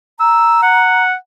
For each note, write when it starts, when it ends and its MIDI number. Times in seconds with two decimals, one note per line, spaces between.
0.20 1.03 82
0.20 0.61 88
0.63 1.14 78